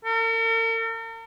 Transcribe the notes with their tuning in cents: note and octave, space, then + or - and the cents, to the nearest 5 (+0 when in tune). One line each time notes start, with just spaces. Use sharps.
A#4 -45